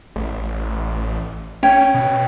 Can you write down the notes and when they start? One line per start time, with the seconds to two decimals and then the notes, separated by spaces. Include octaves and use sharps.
0.16 A1
1.63 C#4 C#5 G5
1.94 B2